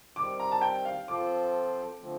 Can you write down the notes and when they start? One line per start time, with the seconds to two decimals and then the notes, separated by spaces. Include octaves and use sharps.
0.16 D#3 G3 C4 D6
0.40 A#5
0.52 A5
0.61 G5
0.85 F5
1.07 F3 C4 F4 A4 C5 D6
2.00 D3 F3 A3 C4